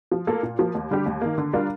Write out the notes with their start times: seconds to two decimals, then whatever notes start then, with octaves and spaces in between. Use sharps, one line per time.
0.11 F3
0.27 A#3 F4 A4
0.43 A#2
0.59 F3 A#3
0.75 D#2
0.91 D3 G3 D4 G4
1.06 D#2
1.21 D#3 A#3
1.38 D3
1.53 G3 D4 F4 A#4